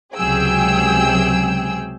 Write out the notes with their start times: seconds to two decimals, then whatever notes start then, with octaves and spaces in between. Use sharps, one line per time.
0.16 C#2 C3 F#3 G#4 G5 E6